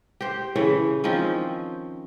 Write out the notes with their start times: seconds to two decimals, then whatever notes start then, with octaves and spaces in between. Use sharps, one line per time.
0.21 G4 C5
0.56 C#3 E3 C#5
1.04 D#3 F3 C4 C#4